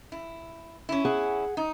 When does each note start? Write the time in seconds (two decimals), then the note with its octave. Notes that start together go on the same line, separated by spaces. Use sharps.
0.12 E4
0.89 C#4 E4
1.05 G#4 F#5
1.57 D#4